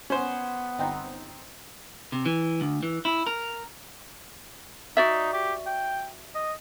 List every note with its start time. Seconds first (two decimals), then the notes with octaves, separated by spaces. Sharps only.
0.10 B3 C#4 C5
0.78 G1 C4 D#4
2.12 C3
2.26 E3
2.61 D2
2.83 E3
3.05 E4
3.27 A#4
4.97 D#4 F#4 D5 E5
5.33 G4
5.66 G5
6.35 D#5